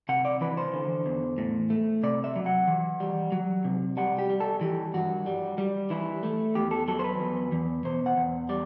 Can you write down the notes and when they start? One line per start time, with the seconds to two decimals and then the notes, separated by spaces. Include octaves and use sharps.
0.09 C3 F#5
0.25 D5
0.41 E3 B4
0.57 C5
0.74 D3
1.06 E2
1.38 A2
1.70 A3
2.03 C3 D5
2.24 E5
2.36 F#3
2.46 F#5
2.68 E3
3.00 G3
3.32 F#3
3.64 C3
3.97 G3 F#5
4.19 G4
4.30 G3
4.40 A4
4.61 E3 G4
4.94 G2 F#4
5.26 G3
5.58 G3
5.90 E3 E4
6.23 A3
6.55 E2 G4
6.71 A4
6.88 F#3 A4
6.99 C5
7.04 B4
7.20 E2
7.52 E2
7.85 B2 C5
8.06 F#5
8.17 E2
8.49 G3 D5